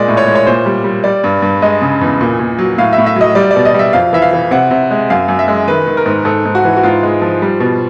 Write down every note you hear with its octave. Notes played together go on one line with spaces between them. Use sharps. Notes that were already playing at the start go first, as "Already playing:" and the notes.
Already playing: A#2 G#3 D5
A2
C#5
G#3
C#5
A#2 C5
G3
G3
G3 D5
G2
G2
G#3 D#5
C#3
E2
A#2
A#2
F#3
A2 F5
E5
A2
E5
F#3 D#5
G3 D5
D5
B2
D#5
G3 E5
F2 F5
E3 E5
F5
E3
C3 F#5
C3
G#3
F#2 F5
F#2
E5
G#3
D#3 B4
D#3
A#4
G#2
G#2 A4
G#2
F#4
E3
F#4
G#2 F4
G#3
F3
G3
B2